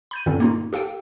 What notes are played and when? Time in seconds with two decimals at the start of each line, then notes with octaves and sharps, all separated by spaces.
0.11 B5 G6 D#7
0.26 G2 A#2 D3 C4 C#4
0.40 A#3 D#4 F4
0.73 G4 A4 F5 G5